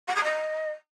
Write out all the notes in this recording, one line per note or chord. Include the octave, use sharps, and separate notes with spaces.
F#5
D#6
D#5